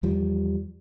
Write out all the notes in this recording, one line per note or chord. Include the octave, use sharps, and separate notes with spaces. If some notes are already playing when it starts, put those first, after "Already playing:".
E2 F3 G3